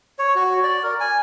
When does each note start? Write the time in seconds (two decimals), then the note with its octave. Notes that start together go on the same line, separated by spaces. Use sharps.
0.19 C#5
0.36 F#4
0.63 D5
0.83 A#4
1.00 G#5